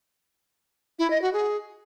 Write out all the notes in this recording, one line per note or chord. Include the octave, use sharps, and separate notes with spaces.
E4
D#5
F#4
G#4